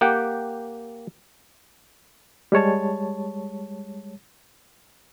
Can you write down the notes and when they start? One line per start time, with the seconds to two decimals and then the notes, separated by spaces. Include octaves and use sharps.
0.01 A#3 G4 F#5 G5
2.52 G3 G#3 C#5 A5